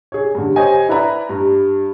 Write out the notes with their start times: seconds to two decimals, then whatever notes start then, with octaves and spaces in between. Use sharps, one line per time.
0.12 G#4 C#5
0.35 G2 D3
0.56 G4 C5 C#5 D#5 G#5
0.89 E4 B4 D5 A#5 B5
1.29 G2